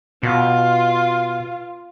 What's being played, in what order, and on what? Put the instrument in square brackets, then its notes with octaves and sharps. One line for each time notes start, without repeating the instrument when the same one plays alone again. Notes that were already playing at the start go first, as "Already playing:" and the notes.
[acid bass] B2 [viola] F4